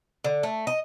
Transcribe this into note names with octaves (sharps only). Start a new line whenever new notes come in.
D3
A3
D#5